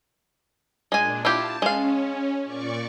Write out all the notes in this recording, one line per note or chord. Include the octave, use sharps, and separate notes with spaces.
A#2 G#3 D4 G#5
E4 F4 G4 A5
G#3 C#4 F5
A#2 D5 C#6